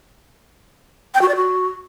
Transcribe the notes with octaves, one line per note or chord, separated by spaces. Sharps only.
G5
F#4
D5
F#4